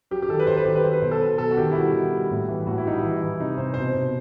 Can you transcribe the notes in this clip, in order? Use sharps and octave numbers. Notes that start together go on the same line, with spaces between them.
F#3 G4
G4
D#3 A4
B4
D#3 C5
B4
D#3 G4
B4
F#3 C5
B4
B2 C5
A4
F#3 B4
B2 A4
F#4
D#3 G4
E4
G3 F#4
D#3
G3
A2
E3
A2 F#4
E4
G3 D#4
E3 E4
E3
C3 D#4
C3 C5
B2 C5
B2